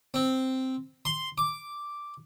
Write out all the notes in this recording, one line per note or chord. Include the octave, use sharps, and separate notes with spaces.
C4
C6
D6